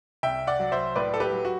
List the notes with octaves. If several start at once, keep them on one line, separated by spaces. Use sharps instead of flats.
C2 E5 G5
D5 F#5
F#3
C5 E5
A2 B4 D5
A4
G4 B4
F#3
F#4